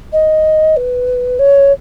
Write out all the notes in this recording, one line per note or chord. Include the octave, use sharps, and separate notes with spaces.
D#5
B4
C#5